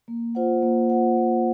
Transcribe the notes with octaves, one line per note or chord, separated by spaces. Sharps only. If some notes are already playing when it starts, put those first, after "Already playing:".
A#3
F4 C5 F#5
A#3
F4 C5 F#5
A#3